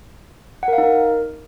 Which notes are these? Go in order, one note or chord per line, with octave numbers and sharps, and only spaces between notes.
F#5
A#4
F5
D#4
A#4